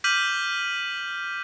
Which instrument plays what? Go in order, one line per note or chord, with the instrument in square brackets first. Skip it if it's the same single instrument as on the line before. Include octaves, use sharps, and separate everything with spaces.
[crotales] D6 F6 G6 B6 D#7 F#7